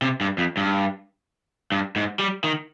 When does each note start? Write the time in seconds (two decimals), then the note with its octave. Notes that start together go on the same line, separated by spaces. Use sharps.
0.02 C3
0.21 G2
0.38 F2
0.57 G2
1.72 G2
1.96 G#2
2.19 G3
2.44 D#3